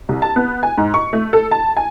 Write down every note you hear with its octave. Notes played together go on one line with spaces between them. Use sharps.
C2
A5
B3
G#5
G#2
C#6
A3
A4
A5
G#5